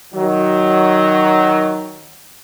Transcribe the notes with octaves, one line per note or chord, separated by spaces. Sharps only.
D#3 F#3